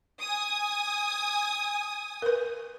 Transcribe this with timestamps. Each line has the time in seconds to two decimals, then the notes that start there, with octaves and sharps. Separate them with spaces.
0.20 G#5 D#6
2.22 A#4 B4